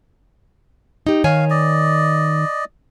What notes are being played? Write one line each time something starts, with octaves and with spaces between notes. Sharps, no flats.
D#4 G4
D#3 C#5 F5 G#5
D5 D#5